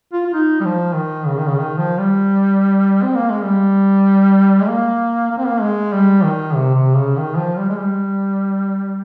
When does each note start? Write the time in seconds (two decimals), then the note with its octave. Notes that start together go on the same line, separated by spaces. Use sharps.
0.13 F4
0.26 F4
0.34 D#4
0.61 G3
0.65 F3
0.95 D#3
1.27 C#3
1.38 D#3
1.47 C#3
1.58 D#3
1.78 F3
2.00 G3
3.03 C4
3.16 A#3
3.31 G#3
3.44 G3
4.62 G#3
4.68 A#3
5.31 A#3
5.38 C4
5.47 A#3
5.61 G#3
5.93 G3
6.24 D#3
6.55 C3
6.75 C3
6.97 C#3
7.17 D#3
7.37 F3
7.58 G3
7.69 G#3
7.79 G3